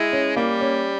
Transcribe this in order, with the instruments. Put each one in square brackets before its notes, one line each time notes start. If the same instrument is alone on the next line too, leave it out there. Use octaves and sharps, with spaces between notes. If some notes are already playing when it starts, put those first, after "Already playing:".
Already playing: [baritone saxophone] G#3 [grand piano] E4
[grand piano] C#4
[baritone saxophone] G3 [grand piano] A#3
[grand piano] C#4